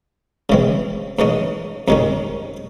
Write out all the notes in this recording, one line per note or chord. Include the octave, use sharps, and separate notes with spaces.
C#3 E3 G#3 C4
G#2 E3 G#3 C#4
F2 C3 D#3 G#3 C#4